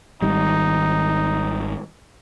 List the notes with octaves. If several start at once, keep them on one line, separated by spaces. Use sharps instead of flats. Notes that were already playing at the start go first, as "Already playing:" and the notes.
G#1 D#3 G3 D#4